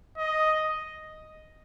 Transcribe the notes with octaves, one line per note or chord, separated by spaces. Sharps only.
D#5